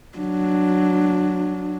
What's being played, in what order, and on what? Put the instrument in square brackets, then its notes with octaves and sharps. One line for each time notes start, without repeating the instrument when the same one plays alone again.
[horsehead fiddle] F#3 D4